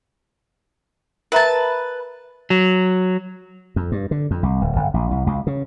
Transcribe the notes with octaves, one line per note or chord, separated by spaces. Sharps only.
A#4 B4 E5 A5 A#5
F#3
F2
G2
D3
F2
C2
D1
G1
A#1
C2
C#2
C#3